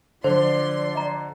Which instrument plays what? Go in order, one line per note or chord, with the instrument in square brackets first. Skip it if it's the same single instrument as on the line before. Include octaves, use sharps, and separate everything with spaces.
[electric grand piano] D3 [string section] F3 C6 [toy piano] C5 [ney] D5
[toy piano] D#5 A#5